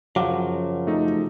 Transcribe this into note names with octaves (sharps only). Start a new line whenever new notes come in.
F#2 C#3 F3 F#3 F5 F#5 D6
A3 D#4